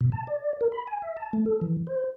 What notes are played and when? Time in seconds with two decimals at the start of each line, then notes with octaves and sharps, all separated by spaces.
0.01 B2
0.12 A5
0.27 D5
0.61 A#4
0.72 B5
0.87 G#5
1.02 E5
1.17 A5
1.33 A3
1.46 A4
1.61 E3
1.87 C5